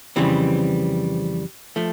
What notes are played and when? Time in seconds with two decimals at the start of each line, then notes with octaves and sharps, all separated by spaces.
0.16 F2 C#3 E3 G3 C4
1.76 F3 A3